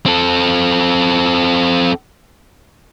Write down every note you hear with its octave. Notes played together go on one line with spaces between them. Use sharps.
C4 A4